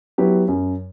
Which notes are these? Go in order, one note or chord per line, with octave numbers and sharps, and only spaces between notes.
F#3 B3 E4 G4
F#2